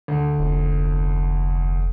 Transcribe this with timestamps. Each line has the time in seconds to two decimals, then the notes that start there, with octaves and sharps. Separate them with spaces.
0.08 D2
0.38 F1